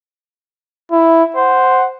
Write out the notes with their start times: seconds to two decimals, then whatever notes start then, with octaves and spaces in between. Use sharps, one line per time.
0.92 E4
1.36 C5 F#5